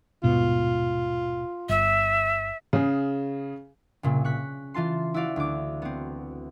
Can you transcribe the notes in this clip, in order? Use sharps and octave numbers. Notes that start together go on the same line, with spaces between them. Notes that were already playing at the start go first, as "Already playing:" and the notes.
D#1 G#2 B2 F4
G1 E5
C#3 G#4
C2 A#2 C#3
C#6 F#6 B6
E3 F4 A5 C6
E4 F#4 D5 F5
D2 D6
B3 C4